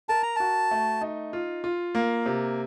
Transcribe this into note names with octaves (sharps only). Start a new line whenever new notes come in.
A#4 A5
A#5
F#4 A5
A3
D#4
F4
F4
A#3
C3